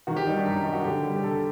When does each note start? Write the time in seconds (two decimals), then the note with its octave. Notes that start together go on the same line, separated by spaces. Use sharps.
0.07 D#3 F#4
0.17 G4
0.27 G3 D#4
0.37 D4
0.47 F#2
0.63 D#3 D#4
0.73 F#4
0.84 D3 G4
1.04 G3
1.16 G4
1.23 D3 A4